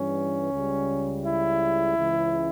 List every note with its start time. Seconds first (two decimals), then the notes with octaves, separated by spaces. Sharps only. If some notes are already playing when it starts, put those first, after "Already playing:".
Already playing: G2 E3 G3 C#4
0.52 C#2 C#3 G3
1.25 E4
1.97 C#2 C#3 E3 G#3